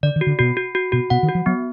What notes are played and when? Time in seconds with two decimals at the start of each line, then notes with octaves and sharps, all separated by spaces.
0.03 D3 D5
0.16 D#3
0.21 F#4
0.27 D3
0.39 B2 F#4
0.57 F#4
0.75 F#4
0.92 B2 F#4
1.10 B2 F#5
1.23 D#3
1.28 F#4
1.35 F3
1.46 F#3 B3